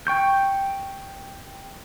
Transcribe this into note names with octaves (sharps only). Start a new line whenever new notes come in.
G5 C#6 G6